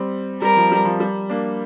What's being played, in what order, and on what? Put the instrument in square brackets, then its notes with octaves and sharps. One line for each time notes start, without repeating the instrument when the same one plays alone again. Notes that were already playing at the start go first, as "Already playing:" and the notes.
Already playing: [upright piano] G3 C4
[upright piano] G3 [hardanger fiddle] A#4
[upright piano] F3
G3
F3
G3
A#3 D4